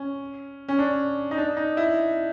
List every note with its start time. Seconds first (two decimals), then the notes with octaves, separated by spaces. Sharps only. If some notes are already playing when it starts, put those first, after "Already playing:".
Already playing: C#4
0.68 C#4
0.79 D4
1.31 D#4
1.38 D4
1.57 D#4
1.77 E4